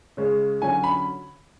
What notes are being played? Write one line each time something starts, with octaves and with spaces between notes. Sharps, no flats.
C#3 G#3 C#4
D3 F#3 C#4 G#5
B5